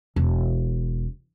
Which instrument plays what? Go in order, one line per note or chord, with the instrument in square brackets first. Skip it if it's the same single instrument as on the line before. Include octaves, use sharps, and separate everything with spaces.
[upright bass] E1